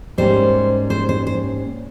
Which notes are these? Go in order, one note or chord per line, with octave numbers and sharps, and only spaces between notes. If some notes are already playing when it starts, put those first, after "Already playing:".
G#2 G3 A#3 C#4 C5
C5
C5
C5